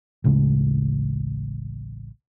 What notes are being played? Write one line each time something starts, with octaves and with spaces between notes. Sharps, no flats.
A1 D2 C#3 G#3